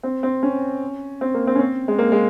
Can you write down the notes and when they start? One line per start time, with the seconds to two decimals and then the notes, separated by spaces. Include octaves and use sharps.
0.03 C4
0.23 C4
0.43 C#4
1.21 C4
1.34 A#3
1.47 C4
1.55 C#4
1.60 C4
1.88 G#3
1.99 A#3
2.12 G#3